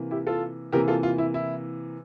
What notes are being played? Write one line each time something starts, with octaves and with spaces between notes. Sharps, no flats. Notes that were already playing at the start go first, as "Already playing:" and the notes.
Already playing: C3 E3 A#3
E4 G4
F4 A4
C3 E3 A#3 G4 A#4
F4 A4
F4
E4
E4